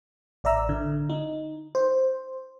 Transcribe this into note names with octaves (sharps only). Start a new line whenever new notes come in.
A1 D5 E5 A#5 E6
D3
D#4
C5